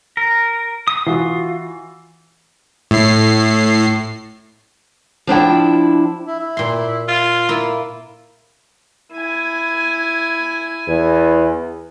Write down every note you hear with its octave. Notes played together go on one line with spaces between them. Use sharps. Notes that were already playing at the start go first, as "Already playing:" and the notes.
A#4
D#6
E3 F4 F#4
A2 C7
F3 D4 E4 G5
E4
E4
A#2 C6
F4
A#3 E4
E4 G#5
E2